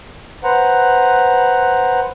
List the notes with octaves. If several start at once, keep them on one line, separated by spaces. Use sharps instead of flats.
B4 C5 F#5 A#5